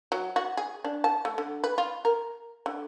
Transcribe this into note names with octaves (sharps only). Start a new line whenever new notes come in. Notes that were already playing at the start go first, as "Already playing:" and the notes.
F#3
F#4
G#4
D4
A5
A3
D3
B4
F4
A#4
D3